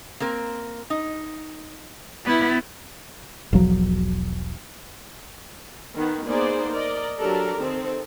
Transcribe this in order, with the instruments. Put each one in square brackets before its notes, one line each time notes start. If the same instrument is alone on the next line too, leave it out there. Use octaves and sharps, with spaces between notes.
[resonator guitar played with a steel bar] A#3 C4 A#4
D#4
[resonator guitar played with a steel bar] B2 [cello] B3 E4
[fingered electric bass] E1 B1 F3 F#3
[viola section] D#3 B3
A#3 B3 D#4 G#4 C5 D5
A#4 D5 D#5
F#3 D4 G4 A4 A#4 D5
D#3 C4 A4